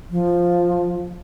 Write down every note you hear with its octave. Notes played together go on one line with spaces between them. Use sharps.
F3